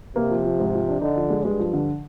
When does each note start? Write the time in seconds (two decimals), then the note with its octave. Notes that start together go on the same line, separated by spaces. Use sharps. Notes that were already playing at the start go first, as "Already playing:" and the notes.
0.16 C3 A#3
0.30 F3
0.45 F3
0.59 G#2
0.74 F3
0.88 D4
1.01 D3 D#4
1.16 F3
1.30 G#3
1.44 G2 G#3
1.59 F3
1.73 D3